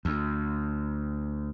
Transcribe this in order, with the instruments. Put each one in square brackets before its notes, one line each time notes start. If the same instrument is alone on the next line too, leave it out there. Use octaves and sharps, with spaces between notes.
[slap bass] D2